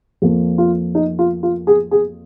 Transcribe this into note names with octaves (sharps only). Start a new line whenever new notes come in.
F2 F3 A#3
F4
D#4
F4
F4
G#4
G#4